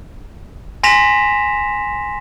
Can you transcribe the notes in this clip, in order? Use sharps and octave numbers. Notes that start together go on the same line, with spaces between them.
G#5 C6 A#6 B6 E7 F7